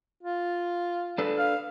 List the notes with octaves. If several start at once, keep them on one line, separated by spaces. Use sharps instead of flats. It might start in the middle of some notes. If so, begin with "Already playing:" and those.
F4
D4 A4 B4
F5